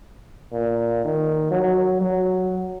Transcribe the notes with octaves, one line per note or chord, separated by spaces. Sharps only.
A#2
D#3
F#3
F#3